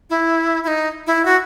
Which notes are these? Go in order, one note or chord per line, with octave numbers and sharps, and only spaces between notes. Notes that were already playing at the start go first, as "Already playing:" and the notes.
E4
E4
D#4
E4
F#4